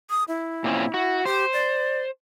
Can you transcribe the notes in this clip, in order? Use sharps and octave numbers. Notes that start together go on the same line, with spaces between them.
D#6
E4
A#2 C4 C#4
F#4
G4 C5
D5